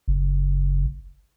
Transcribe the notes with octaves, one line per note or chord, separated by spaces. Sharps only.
F#1